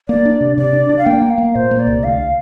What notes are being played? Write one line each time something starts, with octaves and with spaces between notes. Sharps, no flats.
A#3 D5
D4
C3
C3 D5
D4
D4
F5
A#3 G5
A#3
F5
A#3
A#2 C5
A#3
D5
C2
D2 F5